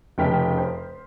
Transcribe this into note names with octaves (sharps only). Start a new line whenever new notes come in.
F1 C#3 G5 F6 B6
C5